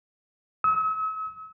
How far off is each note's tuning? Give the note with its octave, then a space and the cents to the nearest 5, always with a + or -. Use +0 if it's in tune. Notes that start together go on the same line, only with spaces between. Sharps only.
E6 -45